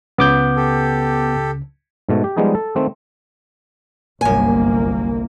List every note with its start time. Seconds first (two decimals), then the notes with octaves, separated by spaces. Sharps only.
0.18 C#2 C#3 B3 D6 G6
0.56 G4 A4
2.09 G#2 B2 A3
2.24 G4
2.36 F3 G3 G#3 B3 D#4 G#4
2.55 A4
2.76 D#3 A3 C4
4.21 G1 C2 F#2 A#3 G#5